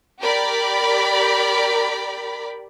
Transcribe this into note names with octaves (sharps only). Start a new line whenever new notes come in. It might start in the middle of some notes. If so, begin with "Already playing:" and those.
G4 A#4 D5 B5